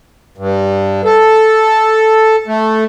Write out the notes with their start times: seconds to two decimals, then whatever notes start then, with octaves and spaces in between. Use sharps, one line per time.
0.38 G2
1.05 A4
2.47 A3